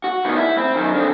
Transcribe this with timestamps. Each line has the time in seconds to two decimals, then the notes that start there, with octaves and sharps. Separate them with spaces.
0.04 F#4
0.25 D#3 B3
0.37 E4
0.57 C4
0.74 F#2 D#3
0.94 D3 C4